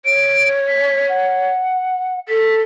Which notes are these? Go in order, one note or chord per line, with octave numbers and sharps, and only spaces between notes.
C#5 D7
B6
F#5
A4 B6